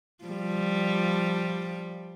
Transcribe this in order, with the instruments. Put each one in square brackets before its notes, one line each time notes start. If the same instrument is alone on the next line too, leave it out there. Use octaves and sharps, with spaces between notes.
[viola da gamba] F3 G3